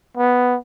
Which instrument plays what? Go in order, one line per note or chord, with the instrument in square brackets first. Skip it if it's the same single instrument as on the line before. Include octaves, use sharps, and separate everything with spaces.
[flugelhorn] B3